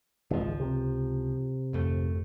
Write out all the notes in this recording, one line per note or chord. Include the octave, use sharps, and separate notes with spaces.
G#1 C#2 F3 G#3
C3
G#1 F2 A3